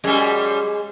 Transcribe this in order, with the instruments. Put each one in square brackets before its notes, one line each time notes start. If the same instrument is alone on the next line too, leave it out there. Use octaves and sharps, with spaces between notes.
[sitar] F#2 G3 [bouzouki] G#3